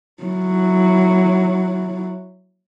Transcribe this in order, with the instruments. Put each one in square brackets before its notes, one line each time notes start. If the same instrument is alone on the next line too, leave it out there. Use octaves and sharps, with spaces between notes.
[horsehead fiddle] F#3 E4